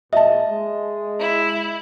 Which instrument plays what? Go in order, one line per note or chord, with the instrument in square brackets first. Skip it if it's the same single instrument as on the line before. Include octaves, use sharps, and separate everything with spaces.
[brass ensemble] A#2 G#4 [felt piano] D#5 A5 [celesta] E5
[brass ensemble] G#3
[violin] E4